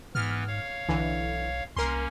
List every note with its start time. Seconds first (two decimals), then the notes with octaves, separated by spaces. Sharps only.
0.15 G#2 E3 B3 F6
0.48 C#5 F5
0.89 B1 D3 E3
1.76 C2 A#3 C#4 A#4 C6